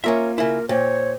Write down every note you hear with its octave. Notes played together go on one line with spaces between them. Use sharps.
A#3 C#4 F4 A#4 E5
C#3 E4 A#4
A#2 C5 C#5 G5